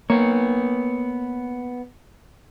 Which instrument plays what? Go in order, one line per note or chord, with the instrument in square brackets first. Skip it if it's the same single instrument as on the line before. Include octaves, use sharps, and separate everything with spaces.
[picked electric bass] A#3 [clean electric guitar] B3 C#5